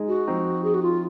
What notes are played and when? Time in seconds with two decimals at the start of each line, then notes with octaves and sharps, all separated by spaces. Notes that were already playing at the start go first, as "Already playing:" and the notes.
Already playing: G#3 D#4 G#4
0.08 F#4
0.27 F3 C4 D#4
0.64 G#4
0.74 F#4
0.83 F4